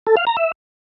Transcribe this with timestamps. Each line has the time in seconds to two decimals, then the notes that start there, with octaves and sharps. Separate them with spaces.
0.07 A4
0.17 F5
0.27 A#5
0.37 E5